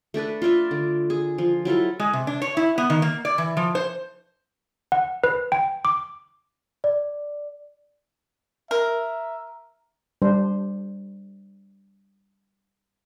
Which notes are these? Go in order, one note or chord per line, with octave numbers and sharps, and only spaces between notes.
A3 D4 A4 B4
F4 A4 D5 E5
D3
G#4
F3
F#3 E4 F4 A4
G#3
C3
D4
C#5
E4
B3
D#3
A#3
D5
E3
F3
C5
F#5
B4
G5
D6
D5
A#4 E5
G3 D4 C5